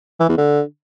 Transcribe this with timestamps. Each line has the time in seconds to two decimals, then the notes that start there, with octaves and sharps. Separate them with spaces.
0.20 E3
0.29 E2
0.38 D3